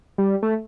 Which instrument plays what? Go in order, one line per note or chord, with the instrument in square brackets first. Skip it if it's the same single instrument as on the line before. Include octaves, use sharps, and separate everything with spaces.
[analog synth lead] G3
A3